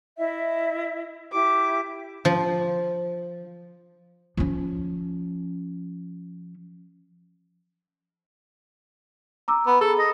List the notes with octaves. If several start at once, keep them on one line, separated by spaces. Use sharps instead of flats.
E4 D#5 E5
E4 G4 D6
F3
F3 C#4
A#5 D6 E6
B3
G#4 A4
D#5